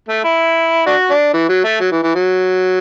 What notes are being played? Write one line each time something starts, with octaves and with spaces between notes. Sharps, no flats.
A3
E4
D4 F#4
D4
E3
F#3
A3
F#3
E3
E3
F#3